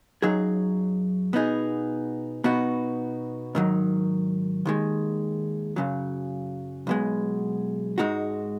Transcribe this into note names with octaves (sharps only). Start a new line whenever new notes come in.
F#2 F#3 D#4 G#4
B2 B3 D#4 G#4
B2 B3 D#4 F#4
G#2 D#3 F#3
D#2 D#3 G#3
F#2 C#3 F#3
B1 B2 G#3
G#2 G#3 D#4 F#4